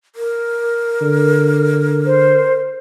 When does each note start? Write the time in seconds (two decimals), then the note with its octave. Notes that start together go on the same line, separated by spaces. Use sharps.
0.16 A#4
1.01 D3
2.06 C5